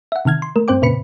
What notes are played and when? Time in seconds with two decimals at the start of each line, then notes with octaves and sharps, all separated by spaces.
0.12 E5 F#5
0.25 C3 D#3 F6 G#6
0.42 C6
0.56 A3 A#4
0.68 G2 C4 C5 G5 D6
0.82 F2 A#2 C#3 B4 B5 C#7